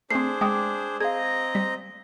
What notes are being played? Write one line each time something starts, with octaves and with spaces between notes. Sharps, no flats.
A3 C4 D4 G#4 C5 C7
G#3 G5 D6 D#6
C4 G#4 D#5 F5 A#5 G#6
G3 B6